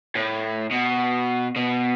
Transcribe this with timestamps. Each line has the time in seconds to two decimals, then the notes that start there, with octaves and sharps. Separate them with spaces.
0.16 A2
0.71 B2
1.56 B2